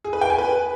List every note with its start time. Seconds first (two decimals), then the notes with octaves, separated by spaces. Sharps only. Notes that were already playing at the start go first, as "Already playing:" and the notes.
0.04 G#4
0.13 B4
0.21 G5
0.30 G#5
0.38 B4